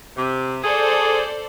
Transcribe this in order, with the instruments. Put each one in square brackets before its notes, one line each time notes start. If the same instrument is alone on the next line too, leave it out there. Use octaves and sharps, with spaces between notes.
[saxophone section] C3
[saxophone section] G#4 [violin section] A4 C5 D5